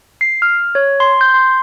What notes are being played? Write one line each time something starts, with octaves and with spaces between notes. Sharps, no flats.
C7
F6
C#5
C6
G6
C6